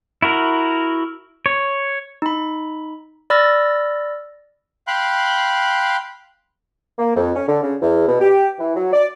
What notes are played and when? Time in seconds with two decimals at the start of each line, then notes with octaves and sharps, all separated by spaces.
0.22 E4 F#4 A#4
1.46 C#5
2.22 D#4 B5
3.30 D5 B5 E6 F6 A6 A#6
4.87 F5 G5 B5 C6 F#6
6.99 A#3
7.16 F2
7.36 C#4
7.48 D3
7.63 C#3
7.81 E2
8.08 B2
8.20 G4
8.59 E3
8.76 F#3
8.93 D5